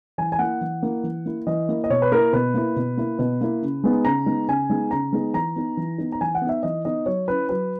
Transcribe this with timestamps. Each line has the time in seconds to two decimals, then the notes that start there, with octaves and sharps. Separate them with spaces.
0.18 E3 G#5
0.32 G#5
0.39 A#3 E4 F#5
0.61 E3
0.83 A#3 E4
1.04 E3
1.26 A#3 E4
1.47 E3 D#5
1.69 A#3 E4
1.84 D#5
1.90 B2 C#5
2.02 B4
2.12 A#3 E4 A#4
2.33 B2 B4
2.54 A#3 E4
2.76 B2
2.97 A#3 E4
3.19 B2
3.41 A#3 E4
3.62 C#3
3.84 G#3 B3 D#4
4.05 C#3 A#5
4.26 G#3 B3 D#4
4.48 C#3 G#5
4.70 G#3 B3 D#4
4.91 C#3 A#5
5.12 G#3 B3 D#4
5.34 E3 A#5
5.56 B3 D#4
5.77 E3
5.98 B3 D#4
6.12 A#5
6.21 E3 G#5
6.35 F#5
6.42 B3
6.47 D#4 E5
6.63 E3 D#5
6.85 B3 D#4 D#5
7.06 F#3 C#5
7.28 C#4 E4 B4
7.49 F#3 B4